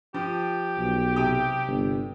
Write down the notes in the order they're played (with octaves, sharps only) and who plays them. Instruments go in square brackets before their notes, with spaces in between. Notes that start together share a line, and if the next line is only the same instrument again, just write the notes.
[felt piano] F3 [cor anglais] G4
[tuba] B1
[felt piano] C3 G5 D#6
[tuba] G1